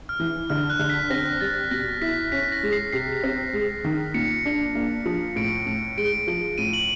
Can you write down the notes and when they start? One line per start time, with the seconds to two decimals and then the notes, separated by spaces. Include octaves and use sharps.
0.09 F6
0.20 E3
0.50 D3 F6
0.70 F#6
0.79 D3
0.90 B6
1.10 C4 A#6
1.41 G3 A6
1.71 B2 A#6
2.01 E4 B6
2.32 C#4 B6
2.52 A#6
2.63 G#3
2.72 C7
2.93 C3 C7
3.24 C4
3.53 G#3
3.84 D#3
4.14 A#2 C#7
4.46 D4
4.75 A#3
5.05 F3
5.36 A2 D7
5.66 A2
5.97 G#3 D7
6.27 F3
6.58 A2 D#7
6.73 F#7